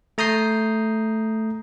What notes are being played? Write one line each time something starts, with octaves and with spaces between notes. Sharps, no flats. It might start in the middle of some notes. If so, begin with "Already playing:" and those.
A3 A#5 D#6 G6 C7